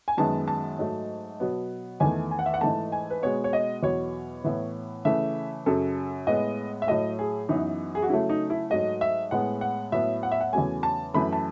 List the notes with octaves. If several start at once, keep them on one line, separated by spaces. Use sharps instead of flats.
G#5
F#2 D#3 G#3 B3 A5
A5
G#2 F#3 A3
B2 F#3 B3
E2 D#3 A3 G#5
G#5
F#5
E5
F#5
G#2 E3 A3 A5
G#5
B4
B2 G#3 B3 C#5
C#5
D#5
E2 B2 F#3 C#5
A2 E3 B3
C#3 E3 A3 E5
F#2 C#3 F#3 A4
A2 G#3 B3 D#5
E5
A2 F#3 A3 D#5
G#4
F#2 E3 B3 D#4
G#4
F#4
C#3 F#3 A3 E4
D#4
E4
G#2 F#3 A3 D#5
E5
A2 G#3 B3 F#5
F#5
A2 F#3 B3 E5
F#5
E5
F#5
E2 C#3 F#3 A3 G#5
A5
F#2 E3 A3 B5
A5